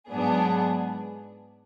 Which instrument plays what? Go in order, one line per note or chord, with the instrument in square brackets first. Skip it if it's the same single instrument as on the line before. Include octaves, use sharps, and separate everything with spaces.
[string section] G#2 F#3 B3 D4 G#4